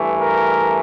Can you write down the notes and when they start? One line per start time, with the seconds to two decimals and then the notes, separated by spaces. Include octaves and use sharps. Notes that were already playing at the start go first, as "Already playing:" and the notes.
Already playing: G2 E3 A3
0.20 A#4